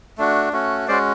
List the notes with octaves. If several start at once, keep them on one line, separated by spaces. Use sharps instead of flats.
A3 D4 F#4
A3 C#4 F#4
G#3 C#4 F#4 C5 D5